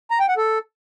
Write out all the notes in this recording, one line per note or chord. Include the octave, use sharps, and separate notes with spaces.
A#5
G5
F#5
A4